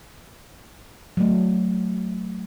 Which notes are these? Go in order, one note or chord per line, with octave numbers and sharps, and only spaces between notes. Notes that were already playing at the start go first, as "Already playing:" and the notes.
F#3 A3